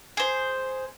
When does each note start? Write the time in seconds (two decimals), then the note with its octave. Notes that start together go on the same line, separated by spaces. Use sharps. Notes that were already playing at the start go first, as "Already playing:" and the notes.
0.17 G#4 C5